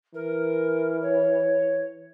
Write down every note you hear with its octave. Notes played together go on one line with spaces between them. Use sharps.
E3 A#4
C#5